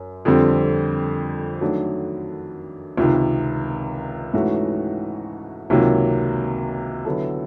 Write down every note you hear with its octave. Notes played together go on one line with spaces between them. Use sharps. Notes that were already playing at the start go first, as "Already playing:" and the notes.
Already playing: F#2
F2 D3 G3 C4
D#3 F#3 A3 D4
C#2 C3 D#3
G#2 E3 A3 C#4 F#4
C#2 C3 D#3 F#3 A#3
D3 F#3 B3 E4 A4